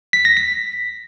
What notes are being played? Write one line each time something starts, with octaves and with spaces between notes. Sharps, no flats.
B6
A#6
B6